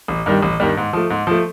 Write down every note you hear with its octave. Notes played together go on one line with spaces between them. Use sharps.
A1
G2 D#3 G3
A1
G2 D#3 G3
G#2
F3 A3
G#2
F3 A3